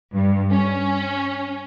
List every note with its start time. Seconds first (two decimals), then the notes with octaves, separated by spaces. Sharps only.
0.13 G2
0.51 C#4